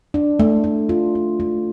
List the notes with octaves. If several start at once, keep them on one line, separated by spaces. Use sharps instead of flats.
D4
A3
A3
F4
D4
A3